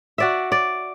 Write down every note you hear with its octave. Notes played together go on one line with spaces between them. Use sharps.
F#4 D5 E5
D5